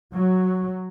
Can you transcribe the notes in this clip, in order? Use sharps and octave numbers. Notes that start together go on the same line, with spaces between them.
F#3